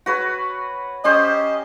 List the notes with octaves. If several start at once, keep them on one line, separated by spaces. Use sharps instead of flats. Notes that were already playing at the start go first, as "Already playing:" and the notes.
F#4 B4 C#5
C#4 G4 C5 D#5